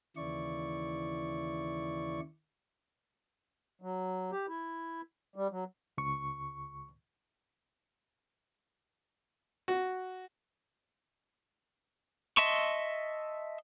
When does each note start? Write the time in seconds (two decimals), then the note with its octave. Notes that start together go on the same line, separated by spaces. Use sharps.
0.17 D#2 C#3 E3 E4 D5 C#6
3.82 F#3
4.32 G4
4.48 E4
5.36 G3
5.51 F#3
5.98 C#2 C#6
9.68 F#4
12.37 D#5 E5 A5 C6 C#6